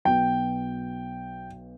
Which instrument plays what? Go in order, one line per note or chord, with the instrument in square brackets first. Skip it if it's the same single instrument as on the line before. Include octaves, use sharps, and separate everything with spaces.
[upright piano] B1 B2 G5